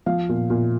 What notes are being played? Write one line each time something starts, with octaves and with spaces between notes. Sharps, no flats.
F3 F5
A#2
A#2